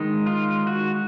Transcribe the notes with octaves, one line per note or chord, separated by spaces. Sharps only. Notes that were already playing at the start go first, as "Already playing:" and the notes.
Already playing: D#3 G#3 D#4
F4
F#4